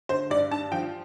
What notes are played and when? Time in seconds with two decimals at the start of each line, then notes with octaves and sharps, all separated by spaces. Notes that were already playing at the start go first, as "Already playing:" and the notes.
0.09 D3 C5
0.30 G2 D5
0.51 G2 A5
0.72 F3 G5